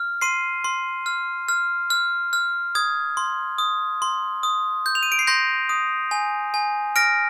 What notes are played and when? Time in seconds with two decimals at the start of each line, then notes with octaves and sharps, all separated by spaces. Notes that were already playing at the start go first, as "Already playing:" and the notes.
Already playing: F6
0.21 C6 C7 D#7
0.64 C6
1.06 F6
1.48 F6
1.90 F6
2.33 F6
2.75 D#6 G#6
3.17 C6
3.58 D#6
4.02 C6
4.43 D#6
4.86 G6
4.95 F7
5.03 D#7
5.12 D7
5.19 C7
5.27 C6 G6 A#6
5.69 D#6
6.11 G#5
6.54 G#5
6.96 F6 A#6 D7